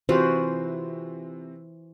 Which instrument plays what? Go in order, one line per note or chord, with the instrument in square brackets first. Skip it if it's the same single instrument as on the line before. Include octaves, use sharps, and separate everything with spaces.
[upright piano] C3 C4 [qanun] E3 F4 F#4 [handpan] C5